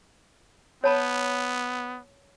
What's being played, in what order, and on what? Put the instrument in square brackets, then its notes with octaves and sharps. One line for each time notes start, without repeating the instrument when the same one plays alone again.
[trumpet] B3 [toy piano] C#5 A5 B5